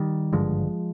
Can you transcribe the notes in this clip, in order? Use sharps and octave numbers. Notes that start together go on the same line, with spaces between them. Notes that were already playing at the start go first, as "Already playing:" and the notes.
Already playing: D#3 G3
G#1 G2 D3 F3 G#3